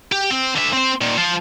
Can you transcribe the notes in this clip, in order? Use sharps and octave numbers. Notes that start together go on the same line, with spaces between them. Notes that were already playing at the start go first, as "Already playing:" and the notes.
G4
C4
D3 E5
C4 C5
A#2 D#3
F3 F4